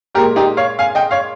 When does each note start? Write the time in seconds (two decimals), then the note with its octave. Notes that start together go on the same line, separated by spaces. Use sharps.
0.15 A#2 G#3 G4 A#4
0.36 D#4 G4
0.57 C#5 F5
0.79 F5 G#5
0.95 D#5 G5
1.11 C#5 F5